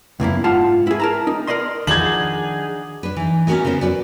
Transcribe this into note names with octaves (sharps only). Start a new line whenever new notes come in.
C#2 F#2 A#3 E4
G#2 F4 F#5 A5
E4 G#4
A#4 A5 A#5
D#4
A#4 C5 D5 D#5 C6
D#3 F3 D4 D#4 F#4 G#4 G#6 F#7
D4 B4
E3 D#4
B3 C#4 D#4 F#4 A#4 D#5
C#3 B3 A#4 C5
F#4 G4 B4 D5